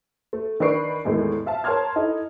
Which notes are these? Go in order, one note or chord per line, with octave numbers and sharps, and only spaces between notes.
A3
D#3 D4 B4 C#6 C7 D7
E2 A2 D#3 G#3 A3
E5 F5 A5
A#4 C#5 A5 C6 F6 G#6
D#4 E4 A4